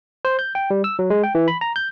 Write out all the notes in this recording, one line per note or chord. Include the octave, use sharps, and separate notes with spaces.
C5
G6
G5
G3
E6
F#3
G#3
G5
E3
B5
A#5
G6